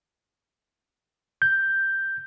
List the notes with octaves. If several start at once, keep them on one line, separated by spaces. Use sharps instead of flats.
G6